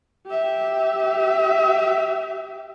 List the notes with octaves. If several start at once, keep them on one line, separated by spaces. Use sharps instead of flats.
G4 E5